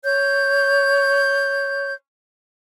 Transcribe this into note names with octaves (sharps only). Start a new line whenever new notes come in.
C#5 G6